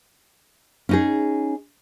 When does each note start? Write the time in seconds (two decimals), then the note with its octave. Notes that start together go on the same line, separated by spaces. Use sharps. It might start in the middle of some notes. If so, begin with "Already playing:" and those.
0.89 C#4 D#4 G#4